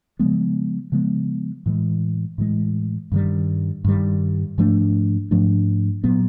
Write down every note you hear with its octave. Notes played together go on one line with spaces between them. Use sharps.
C#3 F3 G#3 B3
C#3 F3 G#3 B3
A2 E3 G#3
A2 E3 G#3
G2 D#3 G3
G2 D#3 G3
G#2 F3 A3 D4
G#2 F3 A3 D4
A#2 F#3 B3